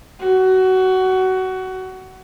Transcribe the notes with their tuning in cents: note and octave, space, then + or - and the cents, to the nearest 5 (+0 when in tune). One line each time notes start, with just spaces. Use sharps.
F#4 +20